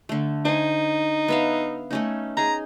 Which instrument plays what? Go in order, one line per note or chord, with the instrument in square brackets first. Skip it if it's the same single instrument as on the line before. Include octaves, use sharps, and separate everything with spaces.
[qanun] D3 A3
[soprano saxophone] D#4 [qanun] C5 G#5
[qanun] B3 E5 F5
A3 C#4 D#4
[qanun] D#4 G#4 [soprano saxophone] A#5